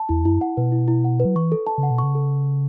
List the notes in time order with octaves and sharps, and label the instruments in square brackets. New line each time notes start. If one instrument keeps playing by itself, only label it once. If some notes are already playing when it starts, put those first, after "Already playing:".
Already playing: [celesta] A5
[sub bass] E2 [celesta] E4
[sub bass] F#2 [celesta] E4
[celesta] F#5
[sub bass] B2 [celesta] B4
[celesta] E4
E4
F#5
B4
[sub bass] F#3
[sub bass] E3 [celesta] C#6
[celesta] A4
A5
[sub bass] C#3
[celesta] F#5
[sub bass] B2
[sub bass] C#3 [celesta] C#6
[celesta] A4